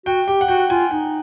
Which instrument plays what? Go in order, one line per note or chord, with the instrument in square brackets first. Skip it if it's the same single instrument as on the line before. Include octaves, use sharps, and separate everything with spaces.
[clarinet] F#4 [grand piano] G5
[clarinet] G4 [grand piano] G5
[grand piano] F#5
[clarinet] F#4 [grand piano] G5
[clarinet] F4 [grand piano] G#5
[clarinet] D#4 [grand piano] G5